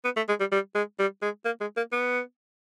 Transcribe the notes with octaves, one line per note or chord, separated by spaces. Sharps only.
B3
A3
G#3
G3
G3
G#3
G3
G#3
A#3
G#3
A#3
B3